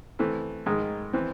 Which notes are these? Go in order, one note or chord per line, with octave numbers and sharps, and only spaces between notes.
E3 A3 C4
G#2 D#3 G#3
E3 C4